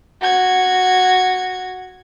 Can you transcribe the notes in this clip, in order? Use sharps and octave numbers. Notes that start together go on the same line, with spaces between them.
F#4 G#6